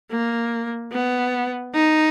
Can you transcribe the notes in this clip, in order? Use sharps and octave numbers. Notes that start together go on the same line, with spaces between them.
A#3
B3
D#4